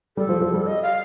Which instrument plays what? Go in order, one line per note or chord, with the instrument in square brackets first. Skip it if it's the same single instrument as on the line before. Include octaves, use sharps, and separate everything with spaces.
[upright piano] G3 [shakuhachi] A4
[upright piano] F3
F3
G3
[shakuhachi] D#5
F5